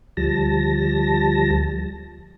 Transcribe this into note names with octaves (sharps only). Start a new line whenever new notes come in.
D2 F3 G3 A5 A#6